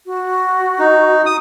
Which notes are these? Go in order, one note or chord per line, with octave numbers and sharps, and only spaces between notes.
F#4
D#4
D#6